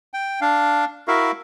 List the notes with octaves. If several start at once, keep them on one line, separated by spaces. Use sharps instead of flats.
G5
D4 F5
E4 F#4 A#4 E5 F5